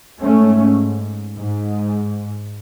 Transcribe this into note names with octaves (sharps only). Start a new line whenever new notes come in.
G#2 A3 C#4
G#2